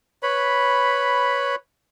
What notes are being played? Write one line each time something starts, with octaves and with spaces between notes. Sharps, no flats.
B4 C#5 B5